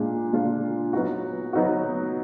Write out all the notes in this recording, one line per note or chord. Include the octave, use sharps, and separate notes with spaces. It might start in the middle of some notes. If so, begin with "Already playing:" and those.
Already playing: A#2 G#3 D4 F4
A#2 G#3 D4 F4
F#3 B3 D#4 F#4
F#3 B3 D#4 F#4